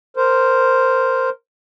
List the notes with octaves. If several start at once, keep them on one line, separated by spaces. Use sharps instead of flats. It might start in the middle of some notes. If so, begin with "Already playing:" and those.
A#4 C5